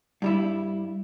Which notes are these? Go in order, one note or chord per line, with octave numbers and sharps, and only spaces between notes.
G2 G3 E4